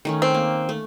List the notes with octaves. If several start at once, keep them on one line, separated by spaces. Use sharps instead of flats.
D#3 A3 C#4
C4
A#3
A3